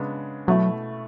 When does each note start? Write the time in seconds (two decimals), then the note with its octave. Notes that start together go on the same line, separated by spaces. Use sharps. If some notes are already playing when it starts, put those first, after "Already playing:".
Already playing: C#3 G#3 B3 D4
0.47 B2 F#3 A3 E4